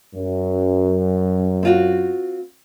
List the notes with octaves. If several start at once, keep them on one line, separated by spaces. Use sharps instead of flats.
F#2
C4 F4 F#4